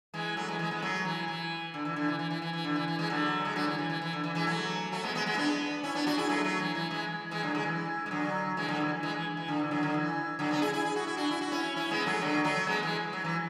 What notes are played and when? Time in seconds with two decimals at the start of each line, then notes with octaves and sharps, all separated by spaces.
0.14 E3 G#3
0.37 F#3 A3
0.48 E3 G#3
0.59 E3 G#3
0.71 G#3 B3
0.82 F#3 A3
1.05 E3
1.28 E3
1.74 D3
1.85 E3
1.96 D3
2.08 E3
2.19 E3
2.31 E3
2.42 E3
2.53 E3
2.64 D3
2.76 E3
2.88 E3
2.99 E3 G#3
3.10 D3 F#3
3.45 G#3
3.56 D3 F#3
3.67 E3
3.79 E3
3.90 E3
4.02 E3
4.13 D3
4.24 E3
4.35 E3 G#3
4.47 F#3 A3
4.92 F#3 A3
5.03 G#3 B3
5.15 G#3 B3
5.26 G#3 B3
5.34 E4
5.37 B3 D4
5.84 C#4 E4
5.95 B3 D4
6.07 D4 F#4
6.18 E4 G#4
6.29 F#3 A3
6.44 F#3 A3
6.60 E3
6.75 E3
6.91 E3 G#3
7.31 E3 G#3
7.43 D3 F#3
7.55 E3 G#3
7.66 E3
8.06 G#3
8.11 D3 F#3
8.57 E3 G#3
8.68 D3 F#3
8.80 E3
9.03 E3 G#3
9.14 E3
9.37 E3
9.48 D3
9.59 E3
9.71 D3 F#3
9.83 D3
9.94 E3
10.39 D3 F#3
10.51 B3 D4
10.62 E4 G#4
10.73 E4 G#4
10.85 G#4
10.96 F#4
11.07 E4
11.17 D4 F#4
11.31 E4
11.41 F#4
11.52 C#4 E4
11.76 C#4 E4
11.91 G#3 B3
12.06 F#3 A3
12.22 D3 F#3
12.44 F#3 A3
12.67 G#3 B3
12.83 E3 G#3
13.13 F#3
13.24 E3